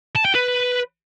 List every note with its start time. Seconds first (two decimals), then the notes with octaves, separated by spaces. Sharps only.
0.16 A5
0.25 G5
0.35 B4